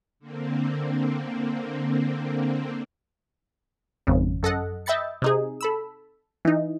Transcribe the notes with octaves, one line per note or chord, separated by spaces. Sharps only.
D3 A#3 C4
G#1 F2 C#3
F#2 A4 D#5 F#5
D#5 E5 G5 B5 A6 C#7
C3 D#4 G#4
A4 B5 E6
E3 D#4